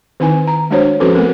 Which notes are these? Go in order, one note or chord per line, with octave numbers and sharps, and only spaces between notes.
D#3 C4 D#4 E4 B4 G#5
A#5
G#3 A3 D4 F#4 C5 C#5
F3 C4 C#4 F#4 A4 B4
A3 B3 C4 F#4 A#4